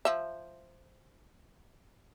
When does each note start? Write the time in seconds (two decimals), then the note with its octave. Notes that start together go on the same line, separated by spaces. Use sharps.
0.05 F3 E5